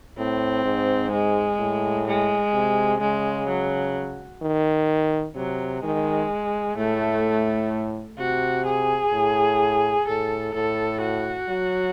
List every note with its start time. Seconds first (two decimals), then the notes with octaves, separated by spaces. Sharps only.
0.18 A2 C4
0.65 G#2
1.12 G#3
1.59 A2
2.07 G#3
2.53 C3
3.01 C#3 G#3
3.48 F#3
4.42 D#3
5.36 C3 F#3
5.83 D#3 G#3
6.77 A2 A3
8.19 C3 F#4
8.66 G#4
9.13 A2
10.08 A2 A4
10.54 A2 A4
11.02 F#4
11.49 F#3